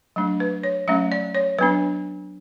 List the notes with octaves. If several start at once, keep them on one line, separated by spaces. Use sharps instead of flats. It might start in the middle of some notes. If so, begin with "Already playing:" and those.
F#3 A3 D4
B4
C#5
F#3 A3 C#4 E5
D5
C#5
F#3 B3 D4 B4